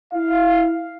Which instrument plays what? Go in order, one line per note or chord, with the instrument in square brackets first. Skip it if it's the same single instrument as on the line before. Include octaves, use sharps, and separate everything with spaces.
[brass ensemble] E4 F5